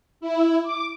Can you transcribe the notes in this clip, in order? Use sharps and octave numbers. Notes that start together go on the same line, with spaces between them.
E4
D6